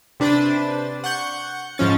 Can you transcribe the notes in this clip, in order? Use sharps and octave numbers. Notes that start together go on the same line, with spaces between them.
C3 D4 B4 C5 A6
F#5 C#6 G6 C#7
G#2 F3 C#4 A6